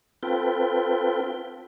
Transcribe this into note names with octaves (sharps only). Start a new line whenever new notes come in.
C4 F4 A4 B4 G5